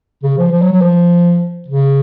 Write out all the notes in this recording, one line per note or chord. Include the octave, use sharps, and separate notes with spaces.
C#3
F3
F3
F#3
F#3
F3
C#3